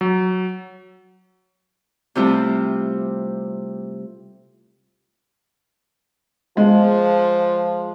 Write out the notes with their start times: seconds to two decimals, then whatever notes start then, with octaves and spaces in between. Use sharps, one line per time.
0.01 F#3
2.15 C3 G3 A3 C4 E4 F4
6.57 F3 G#3